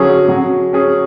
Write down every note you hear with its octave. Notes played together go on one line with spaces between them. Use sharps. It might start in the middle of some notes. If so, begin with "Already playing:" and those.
Already playing: D3 F#3 C#4 G#4
F#3
C#4 G#4